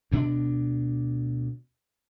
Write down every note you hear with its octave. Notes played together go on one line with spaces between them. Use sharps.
D2 B2 C4 D4